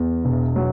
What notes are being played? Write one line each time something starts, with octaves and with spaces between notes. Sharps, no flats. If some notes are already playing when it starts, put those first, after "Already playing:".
Already playing: E2
E1
F#3